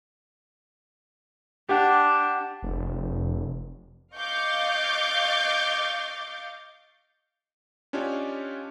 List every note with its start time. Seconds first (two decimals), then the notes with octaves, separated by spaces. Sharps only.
1.69 D4 G4 F#5
2.62 F1
4.16 D#5 F5 C#6 D6 G6 A6
7.93 C#4 D4 F4 G4 C#5 D#5